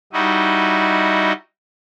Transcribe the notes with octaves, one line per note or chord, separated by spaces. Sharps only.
G3 D#4 E4 F#4 D#5